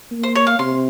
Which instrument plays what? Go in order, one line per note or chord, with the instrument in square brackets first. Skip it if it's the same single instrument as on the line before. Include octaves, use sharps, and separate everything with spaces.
[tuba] A#3
[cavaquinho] C5
C#5
F5
[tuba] C3 [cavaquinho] C6